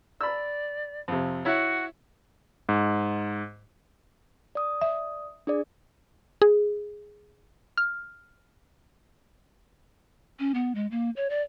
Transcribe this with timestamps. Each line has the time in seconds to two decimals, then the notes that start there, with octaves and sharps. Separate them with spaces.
0.21 D5 B5 E6
1.08 F2 C3
1.45 E4 F#4 C#5
2.69 G#2
4.55 D5 D#6
4.81 E5
5.47 D4 G#4 D5
6.42 G#4
7.78 F6
10.39 C#4
10.54 B3
10.75 G#3
10.91 A#3
11.16 C#5
11.30 D5